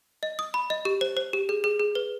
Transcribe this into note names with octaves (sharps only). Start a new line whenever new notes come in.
D#5
D#6
B5
D#5
G4
C5
C5
G4
G#4
G#4
G#4
B4